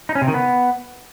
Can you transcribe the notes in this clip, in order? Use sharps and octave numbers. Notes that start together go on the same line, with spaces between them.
D#4
C#4
C3
D#3
B3